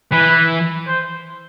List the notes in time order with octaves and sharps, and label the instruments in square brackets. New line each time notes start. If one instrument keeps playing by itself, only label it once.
[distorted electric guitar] E3 [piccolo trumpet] B4
[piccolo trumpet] C5